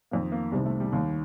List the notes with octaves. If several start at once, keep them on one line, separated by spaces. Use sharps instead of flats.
F2 D#3 A#3
A#3
C2 C3 D#3 G3
A3
G3
D#2 D#3 G3